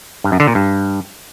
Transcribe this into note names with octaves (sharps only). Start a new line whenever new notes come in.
G2
F#2
D3
A#2
G2